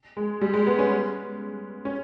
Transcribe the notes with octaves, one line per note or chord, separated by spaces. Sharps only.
G#3
G3
G#3
B3
C#4
C#4